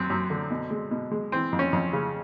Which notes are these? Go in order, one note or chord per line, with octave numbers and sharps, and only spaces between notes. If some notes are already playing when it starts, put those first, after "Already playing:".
Already playing: F#2 F#3 C4
F#2
D3
B2
G#3
B2
G#3
E3 C4
F2
C#4
F2
C#3